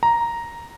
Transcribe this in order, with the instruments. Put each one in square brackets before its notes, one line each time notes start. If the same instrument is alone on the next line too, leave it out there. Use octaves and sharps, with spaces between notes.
[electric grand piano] A#5